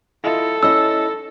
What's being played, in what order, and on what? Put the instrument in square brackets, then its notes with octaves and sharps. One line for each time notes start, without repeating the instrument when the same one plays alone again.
[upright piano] E4 F4 D#5 [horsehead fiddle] A4
[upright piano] C#4 [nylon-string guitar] E4 D#5 [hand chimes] E6